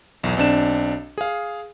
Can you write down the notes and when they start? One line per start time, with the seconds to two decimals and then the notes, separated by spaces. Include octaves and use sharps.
0.23 B1 E2
0.37 B1 C4 D4 E7
1.18 G#4 F5